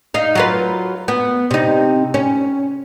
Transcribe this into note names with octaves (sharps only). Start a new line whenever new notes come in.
D#4 F5
F#3 F4 B4
B3
C3 D#4
C#4